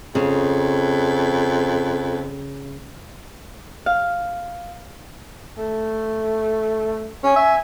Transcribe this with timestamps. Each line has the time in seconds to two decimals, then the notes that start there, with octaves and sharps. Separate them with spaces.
0.15 F2 C#3
3.86 F5
5.58 A3
7.24 C#4 G#5
7.36 E5